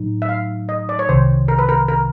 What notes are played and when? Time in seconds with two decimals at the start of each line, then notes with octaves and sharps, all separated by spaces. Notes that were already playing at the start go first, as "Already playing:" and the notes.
Already playing: A2 F#3 D#4
0.22 E5
0.29 F5
0.69 D#5
0.89 D5
0.99 C#5
1.09 C2 C3 D#3 C5
1.48 A#4
1.59 B4
1.69 A#4
1.88 A#4